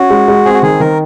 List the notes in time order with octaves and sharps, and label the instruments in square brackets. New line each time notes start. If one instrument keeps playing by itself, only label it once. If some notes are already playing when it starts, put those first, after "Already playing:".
Already playing: [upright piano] C#4 [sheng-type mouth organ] F#4
[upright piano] G#3
G#3
[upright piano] C4 [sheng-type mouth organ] G#4
[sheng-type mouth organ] F#4
[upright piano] D#3 [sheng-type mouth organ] G#4
[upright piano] D#3 [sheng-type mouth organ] A#4